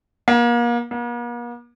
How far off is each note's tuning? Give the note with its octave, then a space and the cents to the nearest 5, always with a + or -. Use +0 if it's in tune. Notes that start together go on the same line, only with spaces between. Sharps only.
A#3 +35
A#3 +45